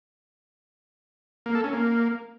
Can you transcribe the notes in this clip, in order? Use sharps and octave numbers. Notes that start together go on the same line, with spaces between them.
A#3
A4
C#4
A#3